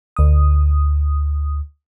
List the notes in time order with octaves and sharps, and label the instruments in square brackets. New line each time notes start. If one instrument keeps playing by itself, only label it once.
[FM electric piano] D2 D#6